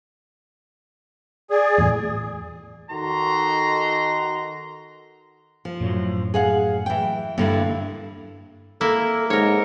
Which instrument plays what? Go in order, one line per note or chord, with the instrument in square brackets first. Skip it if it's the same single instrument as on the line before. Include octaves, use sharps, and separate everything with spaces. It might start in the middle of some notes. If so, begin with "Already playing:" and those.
[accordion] G#4 [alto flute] D5
[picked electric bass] E2 A2
[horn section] D#3 D#4 F#4 A4 A#5 C6
[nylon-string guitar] F3
[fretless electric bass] F#2 A2 F#3
[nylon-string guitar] G#4 F5 F#5
E3 G5
[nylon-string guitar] G2 D3 E4 [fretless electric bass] A#3
[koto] A#3 E4 [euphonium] A4
[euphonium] G#2 [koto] A#4 C#5